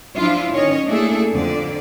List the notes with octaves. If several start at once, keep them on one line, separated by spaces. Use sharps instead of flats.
F3 D4 E4 F4
D#3 C#4 C#5 D#5
A3 A#3 D4 E4 G#4 A4
F2 D3 D5